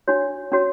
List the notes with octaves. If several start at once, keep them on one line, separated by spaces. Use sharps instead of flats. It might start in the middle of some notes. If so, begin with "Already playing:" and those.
D4 F#4 C#5
C#4 F#4 C#5